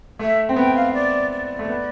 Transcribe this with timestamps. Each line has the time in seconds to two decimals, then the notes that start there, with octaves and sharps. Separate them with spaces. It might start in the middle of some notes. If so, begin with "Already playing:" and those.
0.19 A3 E5
0.49 C4
0.56 B3 G5
0.75 F5
0.93 D5
1.31 D5
1.59 A3
1.68 B3